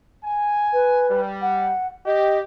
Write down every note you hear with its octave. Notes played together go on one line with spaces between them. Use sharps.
G#5
B4
G3
F#5
G4 D#5